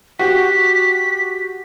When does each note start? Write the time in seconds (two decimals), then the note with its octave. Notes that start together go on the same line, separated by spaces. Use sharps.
0.19 F#4 G4 B6